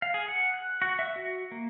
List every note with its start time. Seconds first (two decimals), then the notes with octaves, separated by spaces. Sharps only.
0.02 F5
0.14 G#4
0.28 F#5
0.54 F#6
0.82 F#4
0.99 E5
1.16 F#4
1.52 A#3